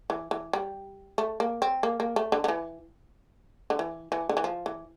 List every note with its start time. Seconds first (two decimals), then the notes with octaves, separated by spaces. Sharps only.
0.10 E3
0.31 E3
0.53 G3
1.18 A3
1.40 A#3
1.62 C4
1.83 A#3
2.00 A#3
2.16 A3
2.32 D3
2.44 D3
2.48 E3
3.70 D3
3.79 E3
4.12 E3
4.29 D3
4.37 E3
4.44 F3
4.66 E3